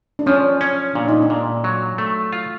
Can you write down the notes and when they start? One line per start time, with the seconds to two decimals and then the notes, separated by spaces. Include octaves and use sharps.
0.19 D4
0.26 F3 C#4
0.61 C#4
0.95 A#2 D4
1.08 D#4
1.22 D4
1.30 A#2
1.64 F#3
1.98 A3
2.33 F4